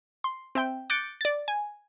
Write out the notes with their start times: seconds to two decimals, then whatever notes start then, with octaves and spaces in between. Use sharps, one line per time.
0.24 C6
0.55 C4 E5 G5
0.90 D6 F#6 G6 A6 C#7 D7
1.21 D5 A6
1.48 G#5